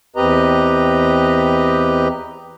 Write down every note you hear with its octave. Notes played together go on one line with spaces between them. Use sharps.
E2 C4 G4 B4 D#5 A#5